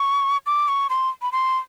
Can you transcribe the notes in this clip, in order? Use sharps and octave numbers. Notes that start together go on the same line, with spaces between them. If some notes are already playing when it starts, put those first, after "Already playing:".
Already playing: C#6
D6
C#6
C6
B5
C6